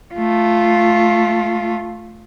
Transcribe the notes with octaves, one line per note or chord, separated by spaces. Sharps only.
A3 F4